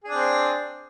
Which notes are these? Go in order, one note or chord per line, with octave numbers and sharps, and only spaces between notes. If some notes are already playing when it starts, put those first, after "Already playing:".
C4 D4 G#4